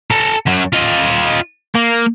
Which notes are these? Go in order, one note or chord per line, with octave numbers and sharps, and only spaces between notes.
A4 A#5
F#2 F#3
F4 D#5
A#3